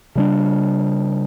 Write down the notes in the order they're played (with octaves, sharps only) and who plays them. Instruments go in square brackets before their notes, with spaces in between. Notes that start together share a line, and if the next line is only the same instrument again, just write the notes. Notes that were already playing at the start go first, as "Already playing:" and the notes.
[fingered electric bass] C#3 G3 D4